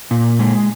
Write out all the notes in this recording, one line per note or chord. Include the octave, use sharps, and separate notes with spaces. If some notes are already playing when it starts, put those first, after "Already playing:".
A#2
G#3